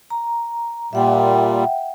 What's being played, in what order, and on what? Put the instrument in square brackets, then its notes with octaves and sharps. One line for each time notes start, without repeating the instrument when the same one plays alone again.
[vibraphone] A#5
[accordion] A#2 G3 [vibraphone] E5 F#5 G5